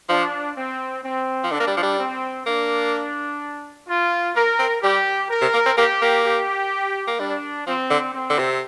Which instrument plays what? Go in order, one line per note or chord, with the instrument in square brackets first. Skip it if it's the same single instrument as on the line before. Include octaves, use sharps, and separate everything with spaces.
[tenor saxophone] F3 [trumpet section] D4
[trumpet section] C4
C4
[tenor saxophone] F3
[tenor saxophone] D3 [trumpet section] D4
[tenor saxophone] A#3
G3
F3
G3
[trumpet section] C4
[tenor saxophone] A#3 [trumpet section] D4
[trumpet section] F4
[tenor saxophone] A#3 [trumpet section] A#4
[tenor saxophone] C4
[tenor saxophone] G3 [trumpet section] G4
[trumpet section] A#4
[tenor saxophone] C3
A#3
C4
[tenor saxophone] A#3 [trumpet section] G4
[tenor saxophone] A#3
[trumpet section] G4
[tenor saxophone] A#3
[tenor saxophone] G3 [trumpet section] D4
[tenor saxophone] F3 [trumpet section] C4
[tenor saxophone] D3
[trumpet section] C4
[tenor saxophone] D3
C3